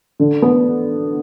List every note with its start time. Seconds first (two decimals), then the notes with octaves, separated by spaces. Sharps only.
0.20 D3
0.42 B3